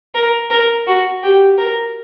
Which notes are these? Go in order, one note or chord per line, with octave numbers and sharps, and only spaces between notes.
A#4
A#4
F#4
G4
A#4